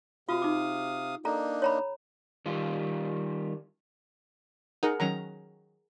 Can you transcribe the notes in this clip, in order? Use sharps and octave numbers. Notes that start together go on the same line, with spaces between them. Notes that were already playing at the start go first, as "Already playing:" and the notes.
C3 F4 F#4 F5 D#6
D#4 D6
A#3 D4 D#4 A4 A#5
C#5 A#5 B5
D#3 G3 F4
D#4 G#4 A#4 F#5
D#3 F#3 C#4 A#5